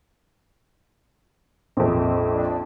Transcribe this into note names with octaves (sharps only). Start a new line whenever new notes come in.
A#1 F2 C4
D4